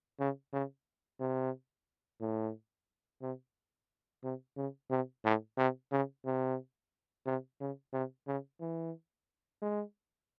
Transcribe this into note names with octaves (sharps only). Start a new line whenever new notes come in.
C#3
C#3
C3
A2
C3
C3
C#3
C3
A2
C3
C#3
C3
C3
C#3
C3
C#3
E3
G#3